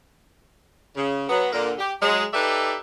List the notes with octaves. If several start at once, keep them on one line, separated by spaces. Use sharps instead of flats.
C#3
F#3 B3
A#2 D3 A#3
G4
F#3 G#3
D#4 G4 A4 B4 D5 E5